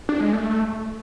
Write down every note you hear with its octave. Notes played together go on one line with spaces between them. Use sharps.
D4
G#3
A3